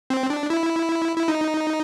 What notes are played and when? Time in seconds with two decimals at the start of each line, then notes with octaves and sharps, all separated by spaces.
0.10 C4
0.30 D4
0.50 E4
1.17 E4
1.28 D#4